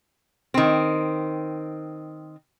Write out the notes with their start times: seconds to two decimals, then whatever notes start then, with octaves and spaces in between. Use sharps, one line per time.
0.54 D#3 C4